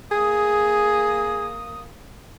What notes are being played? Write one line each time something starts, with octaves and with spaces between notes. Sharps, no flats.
A#3 G#4 D#6